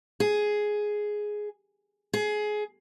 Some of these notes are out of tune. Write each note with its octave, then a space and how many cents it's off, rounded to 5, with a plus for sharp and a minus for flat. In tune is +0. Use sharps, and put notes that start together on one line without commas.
G#4 +5
G#4 +20